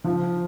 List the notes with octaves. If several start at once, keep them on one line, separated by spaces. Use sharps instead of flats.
F3